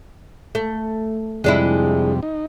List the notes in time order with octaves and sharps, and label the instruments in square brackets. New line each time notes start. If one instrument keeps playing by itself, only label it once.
[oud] A3
[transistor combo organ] F2 C3 G3 [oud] G#3 D4 E4
[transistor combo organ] D#4